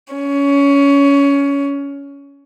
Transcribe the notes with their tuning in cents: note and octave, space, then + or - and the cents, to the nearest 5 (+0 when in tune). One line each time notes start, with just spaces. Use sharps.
C#4 +20